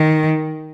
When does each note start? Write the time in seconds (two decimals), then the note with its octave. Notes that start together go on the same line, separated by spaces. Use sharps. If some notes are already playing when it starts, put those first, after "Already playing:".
Already playing: D#3